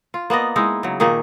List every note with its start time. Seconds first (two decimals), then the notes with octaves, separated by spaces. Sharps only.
0.14 F4
0.30 A#3 B3 D5 D#5
0.56 G#3 D#4 E4
0.83 C#3 F#3
1.00 A#2 D#3 A#3 G#4